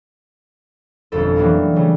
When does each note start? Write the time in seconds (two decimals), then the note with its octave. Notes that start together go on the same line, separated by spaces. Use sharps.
1.12 G1 F2 B2 C#4 A4
1.36 E3 F#3 G3 A#3 D4 D#4
1.76 C#3 G3 A3